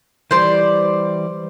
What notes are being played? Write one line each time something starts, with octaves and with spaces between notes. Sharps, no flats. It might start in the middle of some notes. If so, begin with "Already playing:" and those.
E3 G3 C5 D5